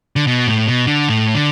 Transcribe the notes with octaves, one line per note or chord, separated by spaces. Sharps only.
D3
B2
A2
B2
D3
A2
D3